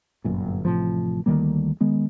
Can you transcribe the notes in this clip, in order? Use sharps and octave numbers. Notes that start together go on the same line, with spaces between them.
G1 F#2 A#2
A1 A2 C3 F3
D2 D#3 G3 A#3
D#3 G#3 B3